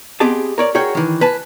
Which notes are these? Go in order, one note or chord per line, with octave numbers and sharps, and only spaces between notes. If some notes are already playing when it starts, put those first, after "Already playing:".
B3 C4 G4 G#4 D#5 A5
A#4 C#5 D5
F#4 G#4 A#4 C#5 G5
D#3 E3
B4 G#5 A5